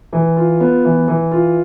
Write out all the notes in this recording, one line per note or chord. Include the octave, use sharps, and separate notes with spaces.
E3
F4
B3
E3
E3
F4